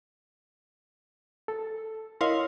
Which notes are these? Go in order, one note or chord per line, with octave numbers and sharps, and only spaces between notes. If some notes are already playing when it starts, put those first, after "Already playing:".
A4
E4 A#4 C#5 D#5 F5 C6